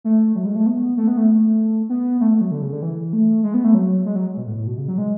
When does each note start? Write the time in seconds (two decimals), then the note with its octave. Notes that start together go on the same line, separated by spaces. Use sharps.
0.04 A3
0.35 F#3
0.45 G#3
0.56 A3
0.66 B3
0.97 A3
1.08 B3
1.17 A3
1.89 B3
2.21 A3
2.31 A3
2.41 F#3
2.51 D3
2.62 C#3
2.72 D3
2.82 E3
3.13 A3
3.43 G#3
3.54 B3
3.64 A3
3.74 F#3
4.06 G#3
4.16 F#3
4.37 B2
4.47 A2
4.57 A2
4.67 B2
4.78 C#3
4.88 F#3
4.98 G#3